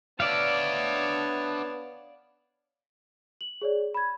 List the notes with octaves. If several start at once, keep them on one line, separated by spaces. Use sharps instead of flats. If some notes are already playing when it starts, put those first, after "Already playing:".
B3 D4 C#5 D5 E5 F5 A5
F#7
G#4 C#5 D5
B5 G#6